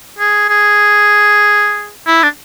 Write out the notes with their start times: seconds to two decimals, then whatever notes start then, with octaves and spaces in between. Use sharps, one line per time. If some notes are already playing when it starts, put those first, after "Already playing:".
0.19 G#4
0.49 G#4
2.07 E4
2.23 D4